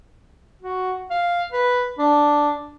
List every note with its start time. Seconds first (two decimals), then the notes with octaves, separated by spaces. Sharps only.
0.62 F#4
1.11 F5
1.52 B4
1.98 D4